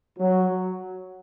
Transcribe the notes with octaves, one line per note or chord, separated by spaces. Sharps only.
F#3